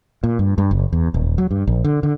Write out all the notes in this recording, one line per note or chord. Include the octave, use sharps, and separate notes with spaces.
A#2
G2
G2
F#1
E2
D#1
F#3
G2
A#1
D3
D3